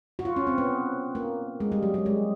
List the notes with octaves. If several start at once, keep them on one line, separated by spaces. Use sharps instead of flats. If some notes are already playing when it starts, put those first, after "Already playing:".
F#4
F4
C#4
C4
B3
A#3
G#3
G3
F#3
G3
G#3